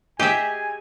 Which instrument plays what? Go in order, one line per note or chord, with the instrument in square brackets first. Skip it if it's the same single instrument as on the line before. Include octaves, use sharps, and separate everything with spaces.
[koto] G4 E5 [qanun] G#4 D#5 [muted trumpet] G#5